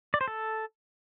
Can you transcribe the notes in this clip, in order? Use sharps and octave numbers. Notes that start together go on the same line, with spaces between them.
D5
C5
A4